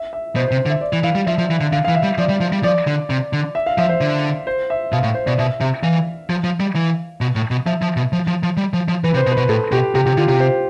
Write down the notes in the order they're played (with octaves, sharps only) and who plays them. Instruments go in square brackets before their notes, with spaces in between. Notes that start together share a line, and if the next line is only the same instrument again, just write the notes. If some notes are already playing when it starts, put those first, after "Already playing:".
Already playing: [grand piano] E5
E5
[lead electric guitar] B2 [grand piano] C5
[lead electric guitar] C3 [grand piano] C5
[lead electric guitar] D3
[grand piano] E5
D5
[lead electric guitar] E3
[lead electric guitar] E3 [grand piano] F5
[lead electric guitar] G3
[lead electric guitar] F3 [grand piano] E5
[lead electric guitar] F3
E3
D3
[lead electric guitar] D3 [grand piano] F5
[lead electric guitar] E3 [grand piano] F5
[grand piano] E5
[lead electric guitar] G3
[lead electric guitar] F3 [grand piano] D5
[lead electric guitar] G3
F3
G3
[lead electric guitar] F3 [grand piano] D5
[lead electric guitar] D3
C3
D3
[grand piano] E5
F5
[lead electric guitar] F3 [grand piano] E5
[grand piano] C5
[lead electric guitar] D3
[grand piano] C5
E5
[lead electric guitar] B2 [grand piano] F5
[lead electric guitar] A2
[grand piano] C5
[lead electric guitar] B2 [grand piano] D5
[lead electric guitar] B2 [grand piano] E5
[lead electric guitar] C3 [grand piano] E5
[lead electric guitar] E3 [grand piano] F5
[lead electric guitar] F3
F3
G3
E3
B2
A2
B2
[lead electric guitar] F3 [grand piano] E5
[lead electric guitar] F3
B2
F3
F3
F3
G3
F3
F3
[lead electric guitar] E3 [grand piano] B4
[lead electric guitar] C3
[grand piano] C5
[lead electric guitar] B2
[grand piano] B4
[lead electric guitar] B2
[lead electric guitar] A2 [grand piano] A4
[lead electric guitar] B2 [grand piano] G4
[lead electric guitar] C3 [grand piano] G4
[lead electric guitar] C3 [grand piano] G4
[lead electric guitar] D3 [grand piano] F4
[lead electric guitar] C3 [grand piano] G4
[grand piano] C5